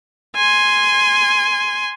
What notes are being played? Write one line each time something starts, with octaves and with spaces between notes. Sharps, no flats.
G#5 C6